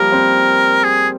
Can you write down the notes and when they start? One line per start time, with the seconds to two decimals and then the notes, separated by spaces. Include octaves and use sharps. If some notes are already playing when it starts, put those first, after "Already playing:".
Already playing: F3 G3 A#3 A#4
0.12 C4
0.84 G#4